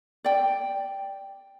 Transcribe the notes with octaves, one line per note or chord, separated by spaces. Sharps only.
D5 G5